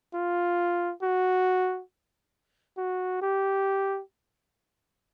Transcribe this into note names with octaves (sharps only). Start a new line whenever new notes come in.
F4
F#4
F#4
G4